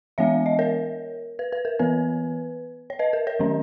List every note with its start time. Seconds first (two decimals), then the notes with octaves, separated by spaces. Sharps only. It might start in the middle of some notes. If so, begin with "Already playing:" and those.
0.18 E3 G#3 B3 C#5 E5
0.46 D#5
0.59 A#4 C#5
1.39 B4
1.52 B4
1.65 A#4
1.79 E3 B3 B4
2.90 C#5
2.99 B4 D#5
3.13 A#4
3.27 A#4 C#5
3.40 D#3 F#3 C#4